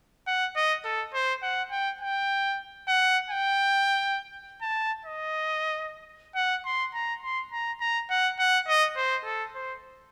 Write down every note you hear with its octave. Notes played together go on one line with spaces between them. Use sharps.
F#5
D#5
A4
C5
F#5
G5
G5
F#5
G5
A5
D#5
F#5
C6
A#5
C6
A#5
A#5
F#5
F#5
D#5
C5
A4
C5